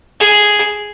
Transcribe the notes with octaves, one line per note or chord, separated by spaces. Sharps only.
G#4